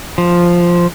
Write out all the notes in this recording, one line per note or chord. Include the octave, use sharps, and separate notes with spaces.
F3